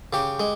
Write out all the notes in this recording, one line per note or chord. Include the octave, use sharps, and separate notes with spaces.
C#3 G4
G#3